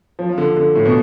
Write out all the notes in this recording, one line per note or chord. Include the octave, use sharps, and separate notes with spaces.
F3
F3
D3
D3
A2
B2